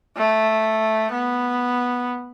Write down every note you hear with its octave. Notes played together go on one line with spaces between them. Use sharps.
A3
B3